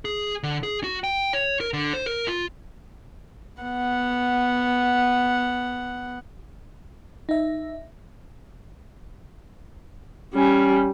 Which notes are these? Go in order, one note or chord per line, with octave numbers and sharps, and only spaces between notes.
G#4
D3
G#4
F#4
G5
C#5
A#4
D3
C5
A#4
F4
B3 F#5
D#4 E5
G3 C#4